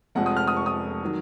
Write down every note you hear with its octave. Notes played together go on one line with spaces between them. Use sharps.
F1 F2 F3 G#3 F#5
D#6
F6
D#6
C#6
D#6
D#3 F#3